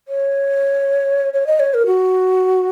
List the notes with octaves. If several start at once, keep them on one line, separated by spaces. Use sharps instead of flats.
C#5
C#5
D#5
C#5
A#4
F#4